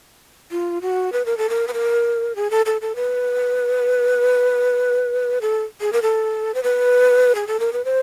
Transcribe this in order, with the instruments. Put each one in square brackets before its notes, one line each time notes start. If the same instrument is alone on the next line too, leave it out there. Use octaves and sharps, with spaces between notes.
[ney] F4
F#4
B4
A#4
A4
A#4
B4
A#4
G#4
A4
A4
A4
B4
A4
G#4
A#4
A4
C5
B4
G#4
A4
A#4
B4
C5